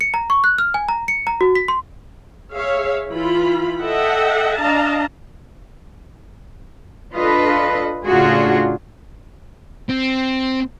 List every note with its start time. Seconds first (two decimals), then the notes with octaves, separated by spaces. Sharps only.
0.01 C#7
0.14 A#5
0.30 C#6
0.44 F#6
0.58 F6
0.74 G#5
0.89 A#5
1.08 C#7
1.27 A#5
1.41 F#4
1.55 B6
1.68 C6
2.52 G#4 C#5 E5 F5
3.08 E3 E4 F4 B5
3.81 A4 D#5 E5 F#5 G5
4.57 D4 D#5 F5 A5 A#5
7.16 D4 F4 A4 B4 D#5
8.06 A2 C#3 D4 F4 F#4 G#4
9.90 C4